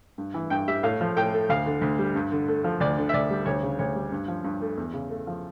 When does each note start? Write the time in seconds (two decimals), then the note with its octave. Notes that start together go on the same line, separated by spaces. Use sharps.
0.18 G2
0.34 E3
0.50 G2 G5
0.68 G3 E5
0.83 A2 F5
1.01 F3
1.17 A2 G5
1.33 A3
1.49 D2 F5
1.66 D3
1.82 D2
1.99 G3
2.15 G2
2.32 D3
2.48 A3
2.64 F3
2.80 D2 D5
2.98 D3
3.09 E5
3.14 D2 D5
3.30 G3
3.46 D2 C#5
3.63 C#3
3.79 D2 C#5
3.95 G3
4.12 G2
4.28 F3
4.44 G2
4.61 A3
4.77 E2
4.93 C#3
5.10 A3
5.27 F3